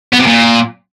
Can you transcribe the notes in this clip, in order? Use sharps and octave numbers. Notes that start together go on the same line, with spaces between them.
B3
C3
A#2